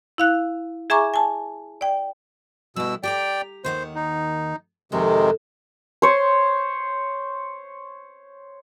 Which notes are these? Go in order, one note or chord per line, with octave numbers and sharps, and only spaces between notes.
E4 F5 F#6
G#4 E5 G#5 A#5 C#6 D6
G#5 A5
D5 G5
B2 G3 E4 E6
G4 D5 G5 A5 A#5
D#2 D#3 C5 F#5
D#4
F2 C3 D#3 G#3 A4
C5 C#5